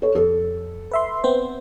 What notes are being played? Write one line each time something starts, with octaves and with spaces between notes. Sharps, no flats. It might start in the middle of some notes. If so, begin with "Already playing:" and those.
A4 C#5
F2 A4
B4 E5 C6
B3 C4 C5